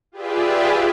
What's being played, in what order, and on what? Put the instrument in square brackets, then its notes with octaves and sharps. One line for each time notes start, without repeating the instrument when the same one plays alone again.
[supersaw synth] F4 G4 G#4 B4 D5 E5